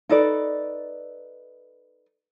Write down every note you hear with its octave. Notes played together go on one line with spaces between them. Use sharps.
D#4 A4 B4 D5